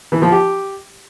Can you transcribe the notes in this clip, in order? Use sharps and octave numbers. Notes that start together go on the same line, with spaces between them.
E3
F3
G4